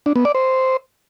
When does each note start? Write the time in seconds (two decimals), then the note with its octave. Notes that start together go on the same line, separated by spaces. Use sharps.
0.06 D4
0.16 B3
0.25 D5
0.35 C5